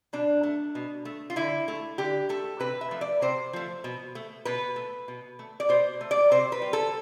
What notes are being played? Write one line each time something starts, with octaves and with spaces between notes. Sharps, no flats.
B2 D4
A3
B2
A3
F4
D3 E4
A3
D3 G4
A3 A4
C3 B4
E5
F3 A3
D5
C3 C5
F3 A3
B2
A3
B2 B4
A3
B2
A3
D5
B2 C5
A3
D5
C3 C5
B4
G3
A4